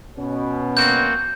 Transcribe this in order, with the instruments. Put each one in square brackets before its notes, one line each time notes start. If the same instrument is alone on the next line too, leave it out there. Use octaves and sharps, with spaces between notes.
[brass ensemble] B2 C#4
[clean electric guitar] A#3 C4 F#4 [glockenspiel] G6